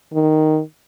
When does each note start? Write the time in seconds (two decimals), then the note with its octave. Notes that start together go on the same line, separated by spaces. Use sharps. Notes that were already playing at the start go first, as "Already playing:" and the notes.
0.13 D#3